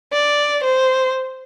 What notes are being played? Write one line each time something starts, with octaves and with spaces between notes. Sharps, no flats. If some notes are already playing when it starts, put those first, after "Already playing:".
D5
C5